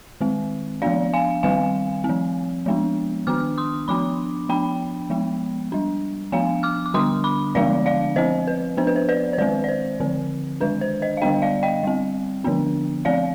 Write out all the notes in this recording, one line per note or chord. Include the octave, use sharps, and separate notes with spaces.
D#3 G#3 C4
F3 B3 D4 D5 F5
F5 G#5
D#3 G3 C4 F5 G#5
C4
F3
F3 G#3 B3 D4
D#3 B3 D4 D6 F6
C6 D#6
F3 B3 D4 B5 D6
F3 B3 D4 G5 B5
F3 G#3 B3
G3 D4
F3 B3 D4 F5 G#5
D6 F6
D6
D3 G3 B3 D4 C6 D#6
B5 D6
D3 F3 G#3 B3 D4 D5 F5
D5 F5
F3 C4 C5 D#5
B4
F3 B3 D4 C5
B4
C5
B4 D5
C5
D#3 G#3 C4 B4 D5
D5
C5
D3 F3 C4
D#3 G#3 D4 B4
C5
C5 D#5
F5
D3 G3 B3 D4 D#5 G5
D5 F5
D#5 G5
G3 C4
D3 F3 B3 D4
F3 C4 D5 F5